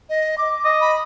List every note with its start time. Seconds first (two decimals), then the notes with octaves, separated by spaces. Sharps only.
0.10 D#5
0.38 D6
0.65 D#5
0.81 B5